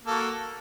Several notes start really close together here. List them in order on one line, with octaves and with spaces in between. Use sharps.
A#3 A4 F#4